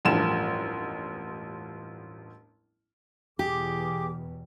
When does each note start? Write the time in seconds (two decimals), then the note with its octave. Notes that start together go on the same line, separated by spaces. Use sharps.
0.05 E1 A1 G2 F3 E7
3.39 E2 B2 G4 G#4 G5 D6